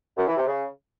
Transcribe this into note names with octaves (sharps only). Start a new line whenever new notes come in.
F#2
E3
C3
C#3